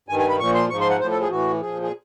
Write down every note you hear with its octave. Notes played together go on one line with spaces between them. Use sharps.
G2 D#3 G#5
G#5
B5
A#2 F3 C#6
C6
G#2 F3 C#6
C6
F#5
A2 F3 C5
A4
G#4
A2 E3 F#4
A#2 F3 G#4
G#4